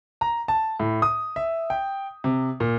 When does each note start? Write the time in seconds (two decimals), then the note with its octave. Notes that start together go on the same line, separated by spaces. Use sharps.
0.21 A#5
0.48 A5
0.80 A2
1.02 D#6
1.36 E5
1.70 G5
2.24 C3
2.60 A#2